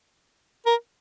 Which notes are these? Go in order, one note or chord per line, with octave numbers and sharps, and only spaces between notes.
A#4